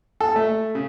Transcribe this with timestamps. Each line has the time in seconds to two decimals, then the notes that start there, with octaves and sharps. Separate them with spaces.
0.20 A4
0.36 A3
0.75 C#3